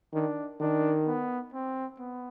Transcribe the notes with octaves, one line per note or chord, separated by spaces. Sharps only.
D#3 D4
D#3 D4
B3
C4
B3